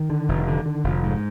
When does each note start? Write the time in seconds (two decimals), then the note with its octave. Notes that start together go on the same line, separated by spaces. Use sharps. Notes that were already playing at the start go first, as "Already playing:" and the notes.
Already playing: D#3
0.10 D3
0.29 F1
0.48 D3
0.66 D3
0.84 F1
1.03 G#2